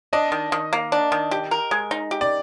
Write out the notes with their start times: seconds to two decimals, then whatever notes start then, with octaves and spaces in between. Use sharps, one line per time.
0.13 D4 D#5
0.32 D#3
0.52 D#3
0.73 A#3
0.92 D4
1.12 D#3
1.31 G4
1.51 A#4
1.71 G#3
1.91 D#4
2.11 G4
2.21 D5